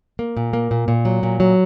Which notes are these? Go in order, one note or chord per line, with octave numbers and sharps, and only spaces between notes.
A#3
A#2
A#3
A#2
A#2
F#3
A#2
F#3